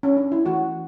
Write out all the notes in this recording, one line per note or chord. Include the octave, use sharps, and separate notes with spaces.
C#4
D4
E4
E3 A3 C#4 F#4